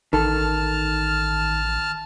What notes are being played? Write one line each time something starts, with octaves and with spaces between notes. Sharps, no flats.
A1 D#3 A4 A5 F6